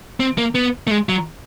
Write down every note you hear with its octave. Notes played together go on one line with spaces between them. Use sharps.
C4
A#3
B3
A3
G#3
F#3